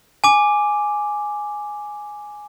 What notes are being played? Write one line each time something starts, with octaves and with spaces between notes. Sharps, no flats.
G#5 D6